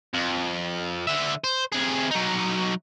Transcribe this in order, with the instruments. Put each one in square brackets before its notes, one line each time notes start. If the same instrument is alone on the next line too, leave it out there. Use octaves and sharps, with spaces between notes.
[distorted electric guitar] F2
D3 E5
C5
C3 G#4
F#3 D#4